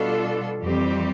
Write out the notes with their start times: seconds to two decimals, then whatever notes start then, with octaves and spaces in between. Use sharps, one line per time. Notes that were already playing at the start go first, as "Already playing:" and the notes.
Already playing: B2 G3 D4 F4 A4
0.61 F2 E3 G3 C4 G4